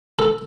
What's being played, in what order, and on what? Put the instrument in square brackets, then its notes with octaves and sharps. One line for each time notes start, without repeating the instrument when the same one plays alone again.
[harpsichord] A4